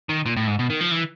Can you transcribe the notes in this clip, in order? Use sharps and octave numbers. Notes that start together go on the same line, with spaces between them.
D#3
A#2
A2
G#2
B2
D#3
F3
E3